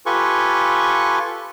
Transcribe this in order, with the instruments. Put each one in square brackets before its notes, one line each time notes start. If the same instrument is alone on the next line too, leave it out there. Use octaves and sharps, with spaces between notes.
[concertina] F4 G4 A4 B4 G#5 C#6